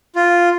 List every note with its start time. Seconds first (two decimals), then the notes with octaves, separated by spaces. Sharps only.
0.16 F4